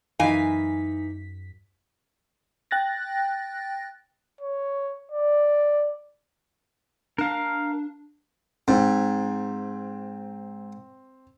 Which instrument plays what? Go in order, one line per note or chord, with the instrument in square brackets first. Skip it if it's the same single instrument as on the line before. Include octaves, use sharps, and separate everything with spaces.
[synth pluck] F#2 B6 [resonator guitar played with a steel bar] E3 F5 G#5 [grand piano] D#4
[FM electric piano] G5 F#6 A6 A#6
[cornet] C#5
D5
[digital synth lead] D4 [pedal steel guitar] A#4 F5
[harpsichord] G#2 [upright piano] C4